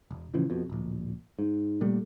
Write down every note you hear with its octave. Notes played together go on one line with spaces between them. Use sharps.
E1
A1 C#3 E3 F3
F2 B2
D1 A#1
G#2
A#2 G3 A3